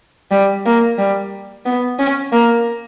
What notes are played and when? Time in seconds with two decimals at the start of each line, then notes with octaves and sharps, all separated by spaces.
0.31 G3
0.65 A#3
0.98 G3
1.65 B3
1.99 C#4
2.33 A#3